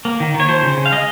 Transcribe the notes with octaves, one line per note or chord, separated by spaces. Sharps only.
A#3
D#3
D#3
C#5
F3 C5
C#3
C#3
F5
G#3 D#5